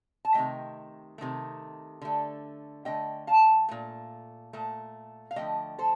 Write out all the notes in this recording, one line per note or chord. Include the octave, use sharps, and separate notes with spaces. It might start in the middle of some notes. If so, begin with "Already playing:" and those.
A5
C3 D#3 A3 D#5 G5
C3 D#3 A3
D3 A3
D3 A3 D#5 G5
F5 A5
A#2 A3
A#2 A3
F5
D3 F3 A3 D#5 G5
A4 C5